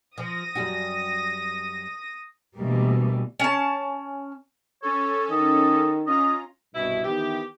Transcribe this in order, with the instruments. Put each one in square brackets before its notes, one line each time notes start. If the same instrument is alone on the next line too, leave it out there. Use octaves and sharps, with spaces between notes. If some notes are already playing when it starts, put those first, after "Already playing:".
[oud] F3 [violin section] D#6 A#6
[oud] F#2 G3 F#4
[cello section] D2 B2 E3 G3 A#3
[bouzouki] C#4 A5
[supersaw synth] C#4 A4 [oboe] C#5
[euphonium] D#3 [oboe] D#5
[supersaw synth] C#4 F4 A#5 [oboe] D#5
[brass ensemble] C2 G2 B2 [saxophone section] E4
[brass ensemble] D#3 E3 B3 [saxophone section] G4